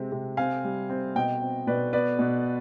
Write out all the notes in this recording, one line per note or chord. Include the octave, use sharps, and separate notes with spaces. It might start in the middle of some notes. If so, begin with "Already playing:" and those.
Already playing: C3 G#3 C4
C3
C4 F5 G#5
G3
C4
B2 D#5 G5
C4
B2 B4 D5
B3 B4 D5
B2